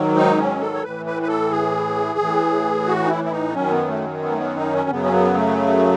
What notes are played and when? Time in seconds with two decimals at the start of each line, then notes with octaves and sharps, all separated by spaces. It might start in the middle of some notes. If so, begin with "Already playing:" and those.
Already playing: G#2 D#3 F#3
0.16 D#4
0.38 C#4
0.60 A4
0.75 C#5
0.83 A2 E3 B4
1.06 B4
1.22 B4
1.28 A4
1.51 G#4
2.19 A2 E3
2.87 F#4
3.04 D#4
3.09 E4
3.24 E4
3.31 D#4
3.49 B3
3.54 F#2 D#3 F#3 C#4
3.71 B3
3.88 A3
4.22 B3
4.31 A3
4.38 B3
4.56 D#4
4.73 C#4
4.90 F#2 C#3 F#3 B3
5.03 C#4
5.13 B3
5.35 A3